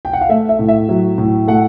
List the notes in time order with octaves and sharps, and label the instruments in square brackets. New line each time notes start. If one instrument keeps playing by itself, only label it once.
[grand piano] G5
F#5
F5
A3 E5
E5
A2
E5
F#3
A2
A3 F#5